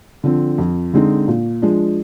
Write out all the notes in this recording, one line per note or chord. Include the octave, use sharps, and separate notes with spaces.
D3 F3 C4
F2
D3 G#3 C4 D#4
A#2
F3 G#3 D4